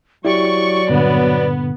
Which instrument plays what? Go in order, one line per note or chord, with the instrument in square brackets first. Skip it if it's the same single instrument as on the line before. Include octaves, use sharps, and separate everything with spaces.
[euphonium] F#3 [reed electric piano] E4 G4 [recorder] D5 [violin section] C#6
[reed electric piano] G2 A#2 D3 [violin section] B3